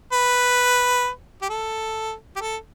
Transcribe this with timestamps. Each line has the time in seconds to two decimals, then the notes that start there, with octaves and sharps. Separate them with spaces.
0.12 B4
1.42 G4
1.49 A4
2.36 G4
2.40 A4